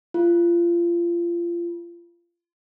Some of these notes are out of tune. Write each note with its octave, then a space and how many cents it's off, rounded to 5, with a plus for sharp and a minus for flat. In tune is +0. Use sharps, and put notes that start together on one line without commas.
F4 -25